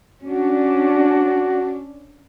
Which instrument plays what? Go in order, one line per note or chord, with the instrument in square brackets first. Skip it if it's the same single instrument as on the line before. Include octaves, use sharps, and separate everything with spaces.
[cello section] C#4 D4 [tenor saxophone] F#4